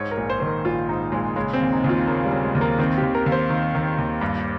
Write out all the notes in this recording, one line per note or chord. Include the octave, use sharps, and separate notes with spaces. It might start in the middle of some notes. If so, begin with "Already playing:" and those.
Already playing: G#2 C#5
A#4
A#1
C5
D#3 C5
A#4
A#1 F4
G#2 D#4
A#1 G#3
C#3 G#3
C4
D#2
D#4
D#2 F4
C#3 A#3
G3
C#3
G#3
D#2
A#3
D#3 C4
D#2 G4
A#4
D#2
C5
D#3
D#3
D#2
G2